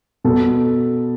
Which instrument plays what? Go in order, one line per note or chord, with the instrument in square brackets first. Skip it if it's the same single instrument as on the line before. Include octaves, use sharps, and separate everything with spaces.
[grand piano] B2 A4